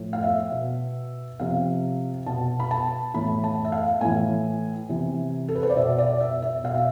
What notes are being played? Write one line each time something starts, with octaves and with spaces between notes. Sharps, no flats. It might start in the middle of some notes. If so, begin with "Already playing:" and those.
Already playing: A2 F3
F5
E5
B2
C3 F3 F5
B2 A5
B5
A5
A2 E3 B5
A5
E5
F5
A2 E3 G#5
C3 E3
A4
B4
C5
D5
B2 E5
D5
E5
E5
B2 F5
E5